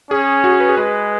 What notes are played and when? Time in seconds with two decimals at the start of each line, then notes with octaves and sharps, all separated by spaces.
0.11 C#4 G#4
0.44 F#4
0.52 G#4
0.60 B4
0.69 G#4
0.77 G#3 B4